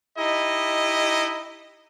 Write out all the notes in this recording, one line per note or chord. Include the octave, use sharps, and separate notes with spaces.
D#4 E4 G4 D#5